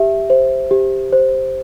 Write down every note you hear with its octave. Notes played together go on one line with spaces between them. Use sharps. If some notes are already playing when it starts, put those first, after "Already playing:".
Already playing: G4 E5
C5
G4
C5